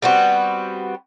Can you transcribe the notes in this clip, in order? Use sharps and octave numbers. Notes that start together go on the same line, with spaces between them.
G3 B3 C4 F#4